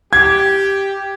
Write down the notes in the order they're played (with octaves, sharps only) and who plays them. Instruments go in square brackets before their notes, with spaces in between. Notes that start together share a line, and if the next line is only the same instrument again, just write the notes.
[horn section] G4 [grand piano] G#6